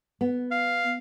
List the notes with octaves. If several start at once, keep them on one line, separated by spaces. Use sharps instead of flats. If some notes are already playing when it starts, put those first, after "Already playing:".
B3
F5